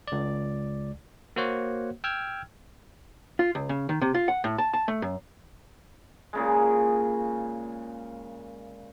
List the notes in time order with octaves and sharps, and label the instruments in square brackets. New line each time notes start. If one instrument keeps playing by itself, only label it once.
[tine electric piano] C#2 D5
A#3 F#4 C5 C#5 F#5
G5 E6 F6 G#6
[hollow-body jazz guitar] F4
C#2
C#3
D#3
C3
F4
F#5
A2
A5
A5
A3
F#2
[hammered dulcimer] A#2 C#3 G#3